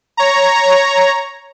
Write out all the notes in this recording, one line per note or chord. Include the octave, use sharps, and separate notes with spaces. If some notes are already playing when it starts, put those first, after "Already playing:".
C#5 A#5